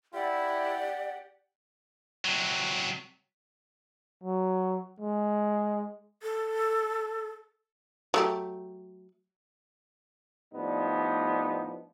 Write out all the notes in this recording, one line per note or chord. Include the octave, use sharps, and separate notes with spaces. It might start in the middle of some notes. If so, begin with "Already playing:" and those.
E4 G4 D5 F#5
C3 F#3
F#3
G#3
A4
F#3 A3 G4
A2 F3 G3 B3 D4 D#4